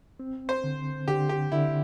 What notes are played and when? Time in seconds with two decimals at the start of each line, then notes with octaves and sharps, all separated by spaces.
0.20 C4
0.49 C5
0.64 D3
1.08 D3 G4
1.29 G4
1.52 D3 E4